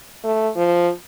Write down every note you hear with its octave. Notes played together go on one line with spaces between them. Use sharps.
A3
F3